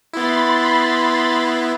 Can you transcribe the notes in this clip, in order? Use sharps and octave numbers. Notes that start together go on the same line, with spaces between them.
B3 E4 B5 C6 A6